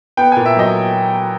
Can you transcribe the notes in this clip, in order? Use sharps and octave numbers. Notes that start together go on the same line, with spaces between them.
B3 G5
A#2 G#5
E5
F#3 D#5